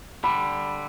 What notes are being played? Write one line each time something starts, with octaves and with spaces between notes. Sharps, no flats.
D3 G3 B5